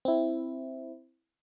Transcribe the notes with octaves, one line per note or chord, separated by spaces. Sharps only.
C4 E4